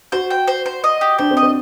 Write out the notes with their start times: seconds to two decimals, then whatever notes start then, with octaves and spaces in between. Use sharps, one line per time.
0.12 F#4 C5
0.30 G5
0.48 C5
0.66 C5
0.84 D#5
1.01 G4
1.19 D4 C5
1.31 C4
1.37 D#5
1.43 C4